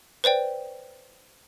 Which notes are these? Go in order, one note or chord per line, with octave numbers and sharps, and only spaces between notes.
B4 C5 D5 G5